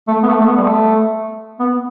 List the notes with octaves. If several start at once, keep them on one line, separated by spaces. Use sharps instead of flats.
A3
B3
A3
A3
B3
G3
A3
B3